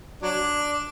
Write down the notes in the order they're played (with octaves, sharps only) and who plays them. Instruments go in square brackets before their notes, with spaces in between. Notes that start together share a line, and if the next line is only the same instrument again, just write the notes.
[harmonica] F#3 D4